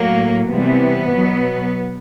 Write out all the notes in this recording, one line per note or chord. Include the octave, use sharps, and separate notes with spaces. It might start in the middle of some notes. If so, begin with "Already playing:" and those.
Already playing: A2 F#3 A#3
C3 E3 G3 B3
B2 F#3